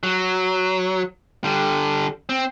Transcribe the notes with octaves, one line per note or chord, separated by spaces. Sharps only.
F#3
D3 G3
C4